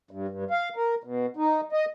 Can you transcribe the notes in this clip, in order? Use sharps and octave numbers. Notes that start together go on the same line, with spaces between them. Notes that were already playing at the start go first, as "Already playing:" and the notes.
G2
G2
F5
A#4
B2
D#4
D#5